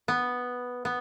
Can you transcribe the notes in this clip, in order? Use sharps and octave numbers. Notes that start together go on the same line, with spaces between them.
B3
B3